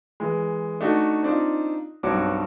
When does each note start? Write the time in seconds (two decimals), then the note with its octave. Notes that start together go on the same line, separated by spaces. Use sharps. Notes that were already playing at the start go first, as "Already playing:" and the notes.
0.20 E3 G#3
0.81 A3 D4 D#4 F#4 A4
1.23 C4 D4 D#4 F4
2.03 B1 G2 C4 F#4 C#5 D6